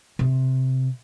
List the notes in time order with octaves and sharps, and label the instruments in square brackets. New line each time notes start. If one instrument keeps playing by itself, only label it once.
[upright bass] C3